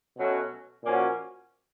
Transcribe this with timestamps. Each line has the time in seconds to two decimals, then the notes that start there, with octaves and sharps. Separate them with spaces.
0.18 B2 F#3 A3 C#4 F#4
0.84 A#2 F3 A#3 C#4 F#4